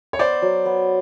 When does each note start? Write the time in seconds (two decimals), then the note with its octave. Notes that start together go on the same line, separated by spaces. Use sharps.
0.13 C#5
0.19 B3 C5 D5
0.42 F#3
0.66 B3